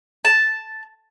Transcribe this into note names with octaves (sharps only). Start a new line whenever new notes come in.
A5